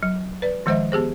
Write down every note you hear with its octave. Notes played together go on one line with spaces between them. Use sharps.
F#3
B4 D5
D#3 F3 G#3 C5 D#5 E5
B3 G4 G#4 C5